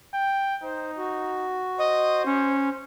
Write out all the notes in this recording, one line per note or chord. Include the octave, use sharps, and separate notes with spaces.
G5
D#4 C5
F#4
C5 D#5
C#4